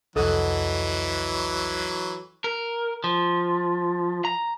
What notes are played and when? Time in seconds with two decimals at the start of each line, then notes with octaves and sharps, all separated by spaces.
0.16 C2 F2 E3 F#3 A4 D#5 F#5
2.44 A#4
3.04 F3
4.25 A#5